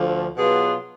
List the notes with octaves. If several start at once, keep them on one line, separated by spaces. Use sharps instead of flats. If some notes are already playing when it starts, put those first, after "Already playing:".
Already playing: D2 D3 F3
B2 F#3 B3 F4 G#4